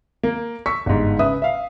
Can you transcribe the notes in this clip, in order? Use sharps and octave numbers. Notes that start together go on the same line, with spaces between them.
A#3
C#6 E6 B6
G1 G#2
C#3 B4 E5 D#6
E5 F5